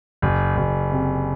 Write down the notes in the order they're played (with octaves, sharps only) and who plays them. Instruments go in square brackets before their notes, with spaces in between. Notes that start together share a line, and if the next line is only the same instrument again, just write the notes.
[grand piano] F#1
F#1
C3